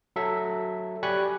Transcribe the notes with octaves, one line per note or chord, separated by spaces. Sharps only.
F#3 A4 E5
G4 D5 G#5 B5 C#6 F#6